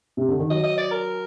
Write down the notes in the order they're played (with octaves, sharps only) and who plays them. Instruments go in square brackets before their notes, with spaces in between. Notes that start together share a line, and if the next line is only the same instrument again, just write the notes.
[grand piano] C3
D3
D#3
[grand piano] F#3 [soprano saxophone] D#5
[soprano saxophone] D#5
D5
A#4